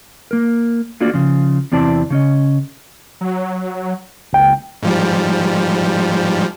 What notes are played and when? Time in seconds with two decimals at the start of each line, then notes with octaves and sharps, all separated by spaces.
0.31 A#3 A#4
1.01 A3 A#3 D4 F4 F#4 D5
1.14 C#3 F3
1.72 E2 C3 C4 E4 D5 A5
2.10 C#3 C#4 D#5
3.21 F#3
4.33 F#1 C#2 G5
4.83 G#2 F3 G3